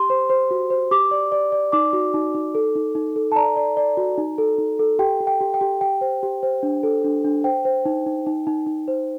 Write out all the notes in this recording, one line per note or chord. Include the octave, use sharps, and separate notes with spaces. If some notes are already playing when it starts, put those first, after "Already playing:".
Already playing: G4 C6
C5
C5
F#4
C5
G4 D6
D5
D5
D5
D#4 D6
F#4
D#4
D#4
A4
D#4
D#4
A4
A5
D5 A#5
D5
D5
F#4
D#4
A4
D#4
A4
G4 G5
G4
G5
G4
G5
G4
G4 G5
C5
G4
C5
D4
A4
D4
D4
C5 G5
C5
D#4
D#4
D#4
D#4
D#4
C5